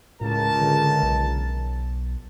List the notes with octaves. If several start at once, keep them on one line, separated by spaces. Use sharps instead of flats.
C#2 A2 A#4 A5
D3
B1